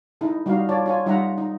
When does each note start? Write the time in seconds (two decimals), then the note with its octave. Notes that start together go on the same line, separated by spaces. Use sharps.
0.21 D#4 E4 A4
0.46 G3 D#4 F#4 D5 F5
0.69 F4 C#5 D5 A5
0.86 F4 C#5 G#5
1.06 G3 D#4 F4 E5 F#5 A#5
1.38 D#4